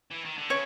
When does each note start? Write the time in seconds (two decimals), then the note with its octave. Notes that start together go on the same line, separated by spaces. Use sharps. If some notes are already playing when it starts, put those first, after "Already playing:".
0.11 E3
0.24 D#3
0.37 D3
0.50 C#3 C#5